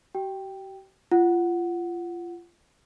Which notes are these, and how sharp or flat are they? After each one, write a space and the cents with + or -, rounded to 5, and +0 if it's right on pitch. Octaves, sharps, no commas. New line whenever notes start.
G4 -45 G5 +0
F4 -25 F#5 +0